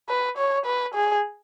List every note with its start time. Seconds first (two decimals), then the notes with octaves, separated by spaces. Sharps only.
0.09 B4
0.38 C#5
0.66 B4
0.95 G#4